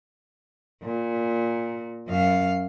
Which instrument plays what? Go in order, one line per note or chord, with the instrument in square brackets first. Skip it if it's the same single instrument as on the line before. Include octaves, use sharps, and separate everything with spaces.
[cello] A#2
F#2 F5